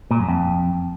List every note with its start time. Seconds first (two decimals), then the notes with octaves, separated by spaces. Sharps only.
0.11 A#2
0.20 F#2
0.28 F2